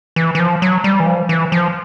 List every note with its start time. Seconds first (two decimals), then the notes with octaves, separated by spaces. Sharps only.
0.16 E3
0.35 E3
0.40 F3
0.62 F#3
0.84 G3
1.00 E3
1.07 F3
1.29 E3
1.52 F3